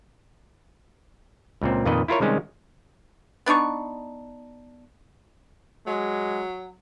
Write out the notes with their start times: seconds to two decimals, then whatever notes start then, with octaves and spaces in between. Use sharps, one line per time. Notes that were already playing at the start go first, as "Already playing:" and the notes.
1.62 C#2 A#2 C4
1.86 F2 A#2 D#3 B4 D#5
2.08 E4 F4 A#4 C#5
2.21 C3 D#3 G3 G#3 C#4
3.46 B3 D4 D#4 C#6
5.87 F#3 G#3